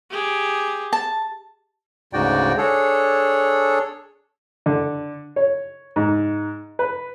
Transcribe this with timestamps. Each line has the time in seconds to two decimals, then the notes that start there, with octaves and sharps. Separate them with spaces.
0.10 G4 G#4
0.93 A5
2.13 D2 G#2 C#3 F#4 D5 G5
2.57 D4 G#4 A4 C#5
4.66 D3
5.36 C#5
5.96 G#2
6.79 B4